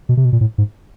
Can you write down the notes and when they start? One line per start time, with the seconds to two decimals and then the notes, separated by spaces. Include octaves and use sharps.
0.09 B2
0.17 C3
0.25 B2
0.33 A#2
0.41 A2
0.58 G#2